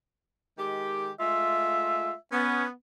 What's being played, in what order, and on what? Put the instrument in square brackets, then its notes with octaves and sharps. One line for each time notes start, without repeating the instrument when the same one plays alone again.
[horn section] D#3 G#3 G4
[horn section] G#3 A3 F4 [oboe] E5
[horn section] B3 [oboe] C#4